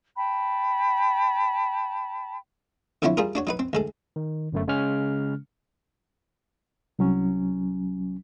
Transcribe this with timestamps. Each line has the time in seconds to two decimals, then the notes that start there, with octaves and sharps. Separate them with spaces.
0.16 G5 A5 B5
3.02 B1 D3 F3 C4 E4 C#5
3.17 G3 F4 G#4 A#4
3.35 D4 F#4 C#5
3.47 F#3 D#4 B4
3.59 C4
3.73 D2 G#3 A4
4.16 D#3
4.52 G1 F#2 A3
4.68 C#3 G#3 C#4 F6
6.99 C2 F#3 C#4